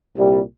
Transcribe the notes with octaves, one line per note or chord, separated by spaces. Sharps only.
C2 A#2 G3